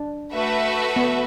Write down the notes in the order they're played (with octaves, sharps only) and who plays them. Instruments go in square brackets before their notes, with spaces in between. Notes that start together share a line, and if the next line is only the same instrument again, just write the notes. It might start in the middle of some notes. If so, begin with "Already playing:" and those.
Already playing: [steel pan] D4
[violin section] A3 F#4 B4 E5
[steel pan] B3